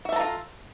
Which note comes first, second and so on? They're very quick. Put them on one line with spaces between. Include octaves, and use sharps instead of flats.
F#4 E5 A4 A#5 F4